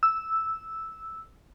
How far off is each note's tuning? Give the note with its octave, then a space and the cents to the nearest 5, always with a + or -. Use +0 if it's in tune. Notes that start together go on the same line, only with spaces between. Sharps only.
E6 -5